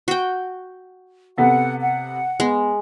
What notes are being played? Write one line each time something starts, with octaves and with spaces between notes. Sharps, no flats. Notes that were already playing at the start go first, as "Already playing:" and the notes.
F#4 G5
C3 B3 A4 F#5
F#5
G#3 B3